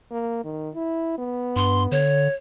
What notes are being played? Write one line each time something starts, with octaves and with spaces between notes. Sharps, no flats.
A#3
D#3
E4
B3
G2 C6
D3 C#5